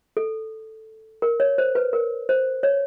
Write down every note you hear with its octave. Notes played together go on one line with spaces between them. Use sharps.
A4
A#4
C#5
C5
B4
A#4
C5
C#5